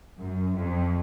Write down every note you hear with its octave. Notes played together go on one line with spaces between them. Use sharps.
F#2
F2